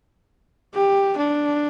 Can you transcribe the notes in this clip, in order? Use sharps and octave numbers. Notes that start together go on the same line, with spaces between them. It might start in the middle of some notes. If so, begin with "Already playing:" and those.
G4
D4